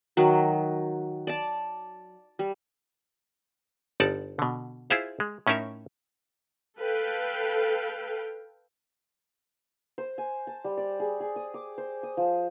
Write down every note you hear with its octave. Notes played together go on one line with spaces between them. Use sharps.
D#3 F#3
D5 A5
G3
G1 D#4 D5 F#5 A5
B2 D3
E4 F4 G#4 C5 F5
G#3
A2 C#4 D#4 A#4 E5
A4 B4 F5 G5
C5
G#5
A5
G3
D5
G#4
G#4
D#6
D6
C5
D#6
F3